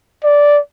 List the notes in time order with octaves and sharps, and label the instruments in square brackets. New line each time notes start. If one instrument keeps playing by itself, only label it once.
[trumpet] D5